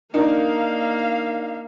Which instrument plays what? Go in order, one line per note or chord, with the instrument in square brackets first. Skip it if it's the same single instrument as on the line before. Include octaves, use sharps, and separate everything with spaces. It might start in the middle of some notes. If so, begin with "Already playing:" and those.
[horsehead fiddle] A#3 F5 [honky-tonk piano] D4 D#4 A#4